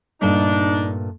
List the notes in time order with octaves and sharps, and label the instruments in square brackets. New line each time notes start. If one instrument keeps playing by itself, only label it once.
[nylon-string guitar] G2 A#2 A3 [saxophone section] D4 D#4